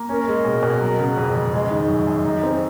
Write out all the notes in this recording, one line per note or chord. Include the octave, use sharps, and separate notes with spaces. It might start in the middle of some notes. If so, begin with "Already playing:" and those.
Already playing: A#3
C#4 A#4
G#3
B2
B2
F#3
C#3
F2
F2
G#3
D#3
F#2
F#2
D#4
C4